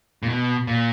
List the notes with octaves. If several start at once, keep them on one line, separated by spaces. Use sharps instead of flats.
A#2
B2
A#2